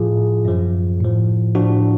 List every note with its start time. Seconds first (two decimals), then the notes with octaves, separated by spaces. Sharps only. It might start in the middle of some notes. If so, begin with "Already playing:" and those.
Already playing: A2 F3 F4 G#4
0.45 F#2 F3
1.00 A2 F3
1.55 A2 F3 D4 F#4